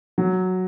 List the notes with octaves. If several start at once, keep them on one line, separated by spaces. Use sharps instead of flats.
F#3